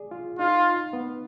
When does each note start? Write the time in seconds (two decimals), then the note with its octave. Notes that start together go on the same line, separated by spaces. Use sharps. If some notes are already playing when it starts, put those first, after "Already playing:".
Already playing: G#4 D5
0.11 F4
0.39 D#4 F4
0.93 B3